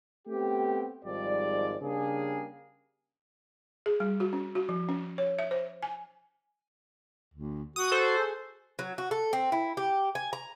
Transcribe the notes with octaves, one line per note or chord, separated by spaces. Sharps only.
A3 B3 C4 G4
G#1 G#2 F3 G3 D5
C#3 G3 A#3 C#4 D4 G#4
G#4
G3
F#4
C#4
F#4
F3
C#4
C#5
E5
C5
G#5
D2
F#4 D#6
A4 C5
G#4
F#3
F#4
A4
C4
E4
G4
G#5
A#5